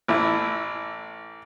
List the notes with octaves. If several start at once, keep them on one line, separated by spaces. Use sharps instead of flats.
A1 E4